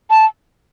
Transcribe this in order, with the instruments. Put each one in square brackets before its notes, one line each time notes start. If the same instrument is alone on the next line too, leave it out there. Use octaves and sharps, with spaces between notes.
[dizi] A5